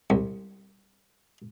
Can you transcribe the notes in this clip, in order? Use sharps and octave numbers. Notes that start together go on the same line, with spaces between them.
C2